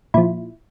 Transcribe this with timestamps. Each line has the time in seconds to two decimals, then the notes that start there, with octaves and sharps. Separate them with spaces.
0.14 A#2 F3 E4